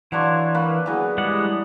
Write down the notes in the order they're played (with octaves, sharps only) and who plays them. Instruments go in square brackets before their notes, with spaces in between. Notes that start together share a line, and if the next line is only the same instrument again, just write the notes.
[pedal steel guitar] E3 [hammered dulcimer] F#3 D4 C#6 [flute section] F5 C6 G#6
[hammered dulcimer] A#3 B4 [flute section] C#6
[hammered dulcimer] E3 F#3 B3 [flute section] G#4
[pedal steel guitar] G3 G#3 F#5 [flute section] E4 D6 D#6